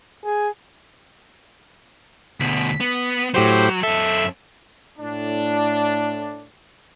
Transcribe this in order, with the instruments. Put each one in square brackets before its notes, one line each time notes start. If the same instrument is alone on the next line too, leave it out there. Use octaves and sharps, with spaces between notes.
[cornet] G#4
[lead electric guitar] D2 B2 [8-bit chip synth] B6
[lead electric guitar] B3
[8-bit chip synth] A2 G4 C5 [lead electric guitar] F#3
[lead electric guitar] F#2 A4 [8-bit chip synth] E5
[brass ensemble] A2 D4